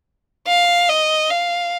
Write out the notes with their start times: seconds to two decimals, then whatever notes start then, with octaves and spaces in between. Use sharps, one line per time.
0.47 F5
0.89 D#5
1.30 F5